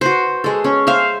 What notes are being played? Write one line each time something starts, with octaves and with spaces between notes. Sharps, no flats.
F#4 B4 C5
G#3 A4
C#4
C5 E5 F5